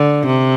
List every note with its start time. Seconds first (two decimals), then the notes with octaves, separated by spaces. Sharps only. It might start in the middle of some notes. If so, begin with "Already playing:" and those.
Already playing: D3
0.26 C3